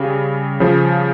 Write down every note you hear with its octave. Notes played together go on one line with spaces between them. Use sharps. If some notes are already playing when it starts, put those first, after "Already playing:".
Already playing: C#3 G3
C#3 F3